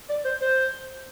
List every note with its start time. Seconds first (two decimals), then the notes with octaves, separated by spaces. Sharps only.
0.09 D5
0.25 C5
0.41 C5